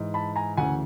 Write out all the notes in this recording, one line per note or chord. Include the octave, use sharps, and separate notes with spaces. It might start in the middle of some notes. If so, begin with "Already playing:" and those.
Already playing: G#2 E3
A5 B5
G#5 A#5
D2 C#3 E3 F#5 G#5